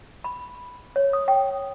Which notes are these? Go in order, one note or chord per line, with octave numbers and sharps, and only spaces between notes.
B5
C#5
D#6
G5